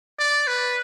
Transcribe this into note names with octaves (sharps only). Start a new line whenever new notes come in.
D5
B4